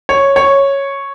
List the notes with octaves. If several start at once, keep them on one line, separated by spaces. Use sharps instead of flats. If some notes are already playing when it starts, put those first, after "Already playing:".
C#5
C#5